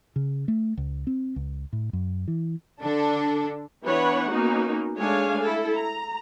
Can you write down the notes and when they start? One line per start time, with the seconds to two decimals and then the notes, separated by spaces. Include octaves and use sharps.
0.16 C#3
0.48 A3
0.77 C#2
1.07 C4
1.36 C#2
1.73 A2
1.93 F#2
2.28 E3
2.81 D3 D4 A4
3.84 E3 B3 D4 B4 C#5 F#5
4.31 A#3 B3 C#4 D#4 F#4
4.97 G#3 A3 D4 C#5 F5 G#5
5.41 E4 A4
5.76 A#5